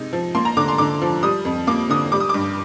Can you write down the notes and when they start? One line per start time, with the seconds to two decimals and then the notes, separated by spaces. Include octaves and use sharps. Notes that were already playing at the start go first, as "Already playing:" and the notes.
Already playing: C3 G#3 D#4
0.13 F3
0.35 A#3 C6
0.45 A#5
0.57 D3 D6
0.68 C6
0.78 D3 D6
1.02 F3
1.23 G3 D#6
1.45 F2
1.67 A#3 D6
1.89 D3 D#6
2.12 G3 D6
2.20 D#6
2.29 G2 D6